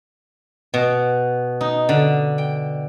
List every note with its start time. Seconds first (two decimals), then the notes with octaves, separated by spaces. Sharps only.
0.74 B2
1.61 D#4
1.89 D3
2.38 G5